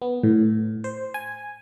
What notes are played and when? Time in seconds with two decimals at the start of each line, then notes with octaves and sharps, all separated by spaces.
0.02 B3
0.23 A2
0.84 C5
1.14 G#5